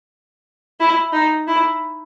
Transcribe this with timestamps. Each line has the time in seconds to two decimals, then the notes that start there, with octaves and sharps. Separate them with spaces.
0.80 E4
1.13 D#4
1.48 E4